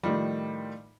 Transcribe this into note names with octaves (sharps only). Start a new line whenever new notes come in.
A2 D#3 F3 G3